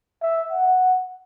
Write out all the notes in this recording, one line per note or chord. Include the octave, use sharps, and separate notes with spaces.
E5
F#5